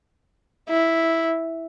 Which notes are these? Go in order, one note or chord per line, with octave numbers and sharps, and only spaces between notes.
E4